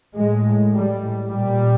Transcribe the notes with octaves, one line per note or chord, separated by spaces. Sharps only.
A2 G#3
G3
A#2 G3